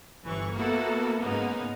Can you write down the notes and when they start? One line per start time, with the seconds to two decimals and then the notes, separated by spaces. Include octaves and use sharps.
0.24 G1 E3 C#6
0.53 A#3 B3 E4 F#4 A4
1.20 G#2 C#3 A#3 B3 D#4